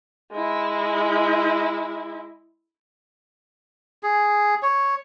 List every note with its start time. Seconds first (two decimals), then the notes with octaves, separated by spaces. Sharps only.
0.32 G#3 E4
4.03 G#4
4.63 C#5